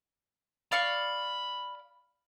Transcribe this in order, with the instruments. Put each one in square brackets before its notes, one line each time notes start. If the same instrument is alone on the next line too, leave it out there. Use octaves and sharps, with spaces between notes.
[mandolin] D5 F5 C#6 [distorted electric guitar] B5